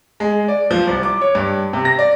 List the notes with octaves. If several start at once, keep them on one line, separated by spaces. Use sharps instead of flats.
G#3
D5
F3
C2
D6
C#5
G2
C3
A#6
D5